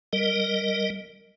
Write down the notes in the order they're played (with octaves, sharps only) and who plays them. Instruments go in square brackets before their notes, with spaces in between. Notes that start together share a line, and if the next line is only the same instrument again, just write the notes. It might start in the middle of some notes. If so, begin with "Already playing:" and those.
[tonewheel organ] G3 A#4 D#5